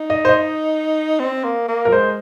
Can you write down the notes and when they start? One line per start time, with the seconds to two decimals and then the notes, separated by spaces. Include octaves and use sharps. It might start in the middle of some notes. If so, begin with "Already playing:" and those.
Already playing: D#4
0.10 D#5
0.25 C5
0.29 D#5
1.20 C4
1.44 A#3
1.68 A#3
1.85 A#4
1.88 F3
1.92 G#3 C5